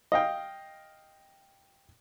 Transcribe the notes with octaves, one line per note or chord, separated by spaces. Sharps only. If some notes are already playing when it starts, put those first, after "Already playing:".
D#5 F5 G5